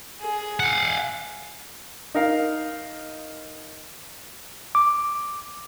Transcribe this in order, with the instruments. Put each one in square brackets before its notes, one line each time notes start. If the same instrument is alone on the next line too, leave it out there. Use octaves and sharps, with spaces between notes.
[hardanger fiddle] G#4
[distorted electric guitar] F5 F#5
[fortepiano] D#4 A#4 F5
[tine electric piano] D6